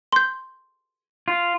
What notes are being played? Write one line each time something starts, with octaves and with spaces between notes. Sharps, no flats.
C6 G6
F4